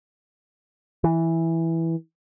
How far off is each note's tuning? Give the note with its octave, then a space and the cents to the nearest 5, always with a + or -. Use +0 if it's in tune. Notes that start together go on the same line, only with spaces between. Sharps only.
E3 -5